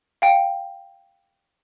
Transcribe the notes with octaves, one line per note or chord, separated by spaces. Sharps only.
F5 G5